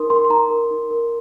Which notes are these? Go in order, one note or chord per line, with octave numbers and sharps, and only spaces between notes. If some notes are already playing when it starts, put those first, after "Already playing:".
Already playing: D#4 A#4 C6 D#6
A#4 C6
C6
D#4 A#5
A#4
D#4
A#4